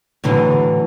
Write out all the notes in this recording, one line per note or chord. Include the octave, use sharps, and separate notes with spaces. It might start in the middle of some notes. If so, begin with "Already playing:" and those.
A2 D3 E3 F#3